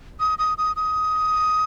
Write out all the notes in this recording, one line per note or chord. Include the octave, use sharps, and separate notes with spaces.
D#6
D#6
D#6
D#6